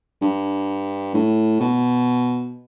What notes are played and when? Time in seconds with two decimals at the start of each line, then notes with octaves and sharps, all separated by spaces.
0.22 G2
1.14 A2
1.60 B2